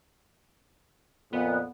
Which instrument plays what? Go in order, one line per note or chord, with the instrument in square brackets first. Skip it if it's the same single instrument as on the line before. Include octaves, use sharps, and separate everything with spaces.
[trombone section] F2 A#2 [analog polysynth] B3